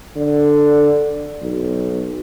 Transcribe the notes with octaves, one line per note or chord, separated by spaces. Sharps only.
D3
B1